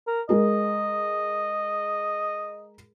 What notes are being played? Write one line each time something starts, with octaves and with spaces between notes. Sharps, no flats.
A#4
G#3 G#4 A#4 D#5